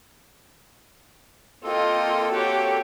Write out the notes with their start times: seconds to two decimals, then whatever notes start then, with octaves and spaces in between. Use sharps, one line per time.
1.64 A#3 C4 F4 A4 D#5 G5
2.30 F#4 G4 C#5